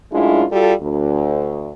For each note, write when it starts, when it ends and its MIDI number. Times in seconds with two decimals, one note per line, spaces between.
0.12 0.44 42
0.12 0.44 45
0.12 0.44 56
0.12 0.44 62
0.12 0.44 64
0.12 0.44 65
0.51 0.72 55
0.51 0.72 65
0.51 0.72 66
0.51 0.72 69
0.81 1.72 38